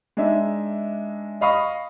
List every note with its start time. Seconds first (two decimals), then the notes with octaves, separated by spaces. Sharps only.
0.17 G#3 D4 D#4 D#5 E5
1.41 D#5 F5 B5 C#6 D#6